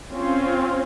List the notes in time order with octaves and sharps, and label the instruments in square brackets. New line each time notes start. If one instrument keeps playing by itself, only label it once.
[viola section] C4 C#4 F4